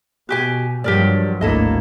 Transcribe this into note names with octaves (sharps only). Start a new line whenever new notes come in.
B2 F#4 G4 G#5
G2 F3 F#3 G4 A#4 D5
G#1 D2 A#3 E4 A4 D#5